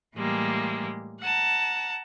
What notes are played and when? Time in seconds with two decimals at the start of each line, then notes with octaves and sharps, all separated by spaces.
0.16 A2 E3 G3 G#3 A#3
1.21 F#5 A5 A#5